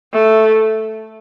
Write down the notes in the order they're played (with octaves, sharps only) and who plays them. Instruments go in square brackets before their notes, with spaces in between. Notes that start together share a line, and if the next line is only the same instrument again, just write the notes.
[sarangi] A3